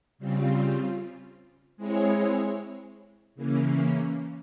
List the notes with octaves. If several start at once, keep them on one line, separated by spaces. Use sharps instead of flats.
C#3 G3 C4 F4
G#3 C4 E4 G#4 C#5
C#3 E3 A#3 C#4